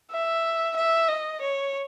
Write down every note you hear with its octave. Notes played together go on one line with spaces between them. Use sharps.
E5
E5
D#5
C#5